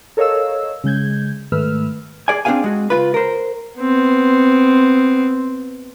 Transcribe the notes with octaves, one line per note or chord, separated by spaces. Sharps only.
A4 A#4 C#5 D#5 F5 E6
C#3 G#3 G6 G#6
G#2 D#3 A3 B4 E6 F6
G#4 D5 G#5
C4 D4 G4 G#4 F5 G#5
G#3 F#4
C#2 F#2 F4 B4
A#4 C5
B3 C4